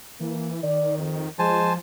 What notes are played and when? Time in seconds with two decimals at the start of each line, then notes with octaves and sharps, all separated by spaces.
0.20 E3 A#3
0.63 D#3 D5
0.98 F2
1.39 F3 G#3 C5 G#5 A5